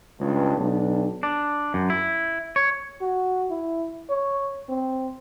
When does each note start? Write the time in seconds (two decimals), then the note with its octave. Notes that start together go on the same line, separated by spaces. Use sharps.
0.19 C#2 G2
0.58 B1 D4
1.23 D4
1.74 F#2
1.90 E4
2.56 C#5
3.01 F#4
3.50 E4
4.10 C#5
4.69 C4